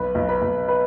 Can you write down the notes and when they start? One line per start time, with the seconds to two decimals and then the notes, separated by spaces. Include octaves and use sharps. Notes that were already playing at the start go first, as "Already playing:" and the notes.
Already playing: B1 B4 B5
0.15 B1
0.29 B4 B5
0.42 B1
0.68 B4 B5